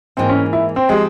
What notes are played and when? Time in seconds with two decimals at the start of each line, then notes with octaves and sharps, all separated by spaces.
0.17 G#2 E3 A#3 C4
0.30 C#4
0.53 E4
0.76 C4
0.89 F3 G#3 C4 G4